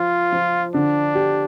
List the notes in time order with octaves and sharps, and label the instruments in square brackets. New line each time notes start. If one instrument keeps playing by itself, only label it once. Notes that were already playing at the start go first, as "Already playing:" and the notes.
Already playing: [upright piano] F3 C5 [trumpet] F4
[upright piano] F3
[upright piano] D3 [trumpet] D4
[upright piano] G4